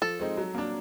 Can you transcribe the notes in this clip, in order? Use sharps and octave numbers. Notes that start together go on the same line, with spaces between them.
F3 A4
G#3 C4 D#4
F#3
A#3 D4